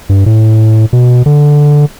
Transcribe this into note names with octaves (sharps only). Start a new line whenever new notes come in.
G2
A2
B2
D3